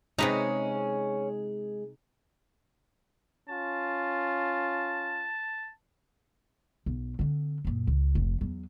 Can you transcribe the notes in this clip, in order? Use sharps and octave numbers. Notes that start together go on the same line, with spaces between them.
C3 G#3 C#4 D#4 G#4 B4 A#5
C#4 F4 A5
B1
D3 C4
F#2 A#2
C#2
F1
E2 F#3